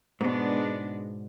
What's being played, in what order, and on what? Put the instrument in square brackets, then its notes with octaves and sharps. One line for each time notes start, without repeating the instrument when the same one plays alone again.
[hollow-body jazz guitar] G#2 B2 [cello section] G#3 B3 D4